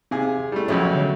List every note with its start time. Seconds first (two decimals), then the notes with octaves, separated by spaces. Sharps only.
0.11 C3 C4 D#4 G#4 F5
0.52 G3 A3 E4
0.68 B1 F2 C#3 F3 F#3 A3 C#4
0.95 D3 C#5